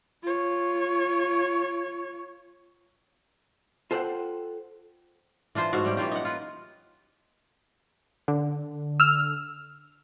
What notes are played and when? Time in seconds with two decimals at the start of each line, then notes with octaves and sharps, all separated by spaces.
0.22 F4 C#5
3.91 F4 A4 C5 C#5 F#5 G5
5.55 E3 D4 F4 C5
5.73 G#2 A3 F#4 F5
5.85 G3 C#4 G4
5.97 E3 A#3 F4 G4
6.11 D#4 F#5
6.25 F4 A#4 B4
8.28 D3
9.00 E6 F6